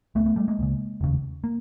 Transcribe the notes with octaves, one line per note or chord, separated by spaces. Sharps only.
C#2 C#3 A3 B3
A3 B3
G3 A3
G#3 A#3
C#2 C#3
F1 D#2 C#3
A#3